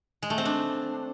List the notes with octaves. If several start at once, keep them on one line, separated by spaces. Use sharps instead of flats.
G#3
A3
C4
D4